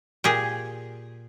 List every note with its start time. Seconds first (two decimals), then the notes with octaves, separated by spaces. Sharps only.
0.24 A#2 G4 G#4